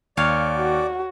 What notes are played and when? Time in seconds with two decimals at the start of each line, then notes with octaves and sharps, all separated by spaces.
0.17 D#2 C#5 D5 F5
0.57 F#4